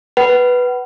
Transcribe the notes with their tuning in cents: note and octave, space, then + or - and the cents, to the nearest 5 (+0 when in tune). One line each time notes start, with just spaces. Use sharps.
B4 +0 F#5 +35